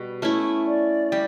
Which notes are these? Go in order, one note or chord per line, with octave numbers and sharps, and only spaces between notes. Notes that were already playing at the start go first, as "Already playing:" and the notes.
Already playing: B2 G3 B3
A3 C#4 E4
D5
G3 G4